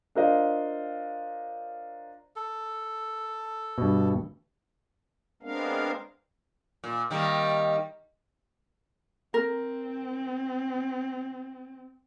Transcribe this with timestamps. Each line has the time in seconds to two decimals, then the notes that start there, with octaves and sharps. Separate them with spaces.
0.15 D4 F4 A#4 C5 D#5 F5
2.36 A4
3.78 G2 B2
5.42 G#3 B3 C4 D4 A#4 F5
6.84 A#2
7.10 D#3 G3 A#3
9.34 C4 A#4